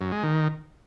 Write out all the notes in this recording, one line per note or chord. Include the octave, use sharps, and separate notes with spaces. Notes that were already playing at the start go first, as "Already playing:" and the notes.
F#2
G#3
D#3